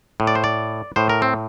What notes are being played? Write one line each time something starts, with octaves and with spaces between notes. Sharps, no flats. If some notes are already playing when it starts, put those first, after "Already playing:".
A2
D5
C5
D5
A2 C5
A#4
C4